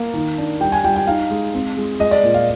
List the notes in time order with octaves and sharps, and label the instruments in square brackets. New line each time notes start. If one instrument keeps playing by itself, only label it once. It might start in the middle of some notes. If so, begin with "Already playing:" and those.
Already playing: [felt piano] A#3 F5
D#3
D4
G3 G5
G#5
G3 G5
G5
D#4 F5
G#3
C4
G#3
G#3 D#5
D5
A#2
F5